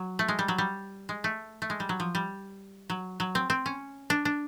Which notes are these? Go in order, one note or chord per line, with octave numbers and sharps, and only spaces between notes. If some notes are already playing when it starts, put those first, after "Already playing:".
Already playing: F#3
A3
G#3
G3
F#3
G3
G#3
A3
A3
G#3
G3
F#3
F3
G3
F#3
F#3
C4
C4
C#4
D4
D4